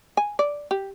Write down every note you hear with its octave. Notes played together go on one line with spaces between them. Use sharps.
G#5
D5
G4